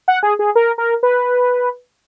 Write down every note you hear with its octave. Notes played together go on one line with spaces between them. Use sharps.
F#5
G#4
G#4
A#4
A#4
B4